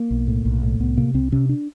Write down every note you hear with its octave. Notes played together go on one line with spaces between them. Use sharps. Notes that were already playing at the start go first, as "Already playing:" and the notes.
Already playing: A#3
B1
A2
B1
A2
C2 B3
C3 A#3
C2 C4
C3 C#4
D4